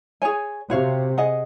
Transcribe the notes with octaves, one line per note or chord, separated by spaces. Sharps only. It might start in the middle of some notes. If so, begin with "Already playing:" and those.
G#4 C#5 G#5
C3 F#4 C#5 F5
G#4 D#5 F#5